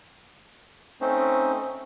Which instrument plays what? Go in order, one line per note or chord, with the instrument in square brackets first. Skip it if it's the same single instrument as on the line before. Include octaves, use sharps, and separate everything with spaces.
[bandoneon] A3 C4 C#4 D#4 C5